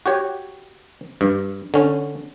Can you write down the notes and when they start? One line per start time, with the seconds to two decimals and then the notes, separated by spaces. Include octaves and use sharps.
0.06 F#4 G4 C#5
1.21 G2
1.74 D3 C#4